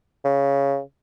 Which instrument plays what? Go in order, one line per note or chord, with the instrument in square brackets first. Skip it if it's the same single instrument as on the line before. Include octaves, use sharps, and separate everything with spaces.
[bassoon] C#3